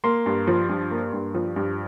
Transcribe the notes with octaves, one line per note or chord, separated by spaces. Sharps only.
A#3 C6
G2
F3
G2
A#3
G2
F3
G2